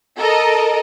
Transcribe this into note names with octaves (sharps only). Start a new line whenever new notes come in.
A4 A#4 D#5